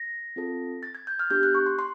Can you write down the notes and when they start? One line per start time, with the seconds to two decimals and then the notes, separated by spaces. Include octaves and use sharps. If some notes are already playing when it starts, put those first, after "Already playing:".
Already playing: A#6
0.36 C4 F4 A4
0.83 A6
0.95 G#6
1.07 G6
1.19 F6
1.30 B3 D4 G4 G6
1.43 F#6
1.55 C#6
1.66 C6
1.79 C6